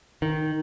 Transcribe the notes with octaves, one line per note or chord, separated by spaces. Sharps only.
D#3